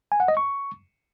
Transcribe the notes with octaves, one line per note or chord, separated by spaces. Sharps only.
G#5
F#5
D#5
C#6